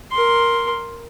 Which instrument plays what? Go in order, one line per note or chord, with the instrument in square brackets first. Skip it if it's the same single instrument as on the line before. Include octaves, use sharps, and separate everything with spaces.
[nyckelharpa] A#4 C6